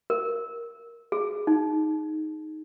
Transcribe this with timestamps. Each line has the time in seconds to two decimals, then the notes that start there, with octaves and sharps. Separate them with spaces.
0.10 A#4
1.12 G#4
1.47 D#4